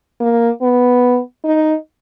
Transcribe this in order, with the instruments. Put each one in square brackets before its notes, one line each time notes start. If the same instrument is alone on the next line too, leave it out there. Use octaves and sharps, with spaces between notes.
[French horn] A#3
B3
D#4